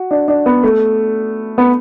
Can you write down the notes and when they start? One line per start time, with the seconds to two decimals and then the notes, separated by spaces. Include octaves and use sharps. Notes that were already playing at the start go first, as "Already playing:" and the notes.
Already playing: F#4
0.11 D4
0.28 D4
0.46 B3
0.63 A3
1.58 B3